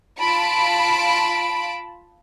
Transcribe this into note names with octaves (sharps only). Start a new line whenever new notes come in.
F4 A5 B5 D7